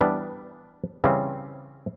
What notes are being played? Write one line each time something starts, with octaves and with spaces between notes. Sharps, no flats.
E3 G3 B3 D4
C#3 E3 G3 C4